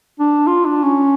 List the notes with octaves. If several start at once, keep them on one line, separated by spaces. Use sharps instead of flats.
D4
F4
D4
C#4